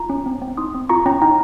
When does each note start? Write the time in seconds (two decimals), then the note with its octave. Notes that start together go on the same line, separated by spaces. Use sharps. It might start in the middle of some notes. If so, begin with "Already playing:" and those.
Already playing: F4 A#5
0.10 C#4
0.26 C4
0.42 C4
0.57 D#4 C6 D#6
0.74 C4
0.89 F4 A#5 C#6
1.06 C#4 G5 A#5
1.22 D#4 G5 A#5